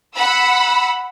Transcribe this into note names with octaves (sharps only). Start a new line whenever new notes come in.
F#5 B5 E6